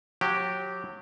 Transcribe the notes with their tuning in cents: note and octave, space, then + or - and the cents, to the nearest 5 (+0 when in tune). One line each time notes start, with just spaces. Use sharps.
F#3 -25 G4 -10